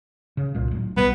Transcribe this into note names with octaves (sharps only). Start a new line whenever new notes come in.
C#3
C2 A#2
D1
B1 B2 G3 B3